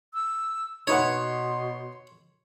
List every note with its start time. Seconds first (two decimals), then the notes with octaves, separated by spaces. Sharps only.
0.14 E6
0.87 B2 D#4 B4 C#5 F#5 C6